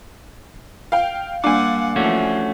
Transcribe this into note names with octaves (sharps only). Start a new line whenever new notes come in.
F5 G5
G3 A#3 D4 F5 F#5 G#5 D6
E3 F3 A3 C#4 F#4